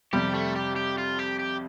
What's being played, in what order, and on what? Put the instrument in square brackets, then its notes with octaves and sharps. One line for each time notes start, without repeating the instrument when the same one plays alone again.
[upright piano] F2 C3 G3 [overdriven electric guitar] G4
[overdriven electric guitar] A3
G4
G4
F4
G4
G4